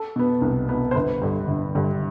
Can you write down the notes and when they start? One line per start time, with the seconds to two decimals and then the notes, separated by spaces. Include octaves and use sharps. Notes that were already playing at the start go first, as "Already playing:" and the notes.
Already playing: A4
0.16 B2 B3
0.41 C2
0.69 B2 B3
0.91 C5
0.95 G1 B4
1.22 G2 D3
1.48 G1
1.75 G2 D3